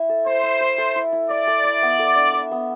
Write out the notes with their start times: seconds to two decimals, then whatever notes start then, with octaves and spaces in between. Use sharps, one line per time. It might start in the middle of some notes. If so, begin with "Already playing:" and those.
Already playing: E4 E5
0.09 A4
0.26 E4 C5
0.43 E4
0.61 E5
0.78 A4
0.96 E4
1.13 E4
1.30 D5 E5
1.47 A4
1.64 E4
1.82 B3
1.99 A4
2.16 D4
2.34 E5
2.52 B3